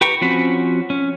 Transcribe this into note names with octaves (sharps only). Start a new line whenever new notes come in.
G4 B4 G5 A#5 C#6
F3 C4 C#4 F#4 B5
C#4